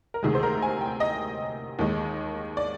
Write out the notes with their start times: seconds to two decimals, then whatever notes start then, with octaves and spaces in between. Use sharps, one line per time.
0.14 A#4
0.23 D2 C3 D#3 G#3 G#4
0.35 C5
0.43 A#4
0.63 G#5
0.81 G5
1.00 D#5
1.79 D#2 D#3 G#3
2.57 D5